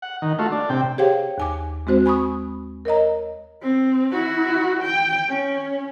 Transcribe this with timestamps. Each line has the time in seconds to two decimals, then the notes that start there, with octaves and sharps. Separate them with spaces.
0.02 F#5
0.22 D#3
0.39 A3 F4 F#4
0.52 D4
0.70 C3 G5
0.98 G4 G#4 C5 C#5 F5 G5
1.38 D#2 G#5 D6
1.87 G#3 C4 F#4 C5
2.06 G#5 B5 C#6 D#6
2.85 A#4 C#5 D#5 A#5
3.62 C4
4.12 E4 F#4
4.82 G5
5.28 C#4